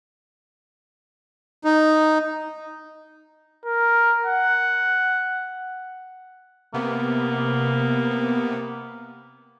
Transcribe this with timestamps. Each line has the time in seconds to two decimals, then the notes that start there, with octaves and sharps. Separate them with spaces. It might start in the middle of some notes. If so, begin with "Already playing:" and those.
1.64 D#4
3.65 A#4
4.26 F#5
6.74 C3 A#3 B3